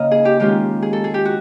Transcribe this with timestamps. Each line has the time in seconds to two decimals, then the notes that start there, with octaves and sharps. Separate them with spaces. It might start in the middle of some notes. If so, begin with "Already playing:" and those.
Already playing: C#3 A#3 D#4 D#5 F5
0.11 G#4
0.25 G4
0.39 D#3 G#3 C#4 F4 G4
0.82 G#4
0.93 A4
1.04 G#4
1.14 G4
1.25 F#4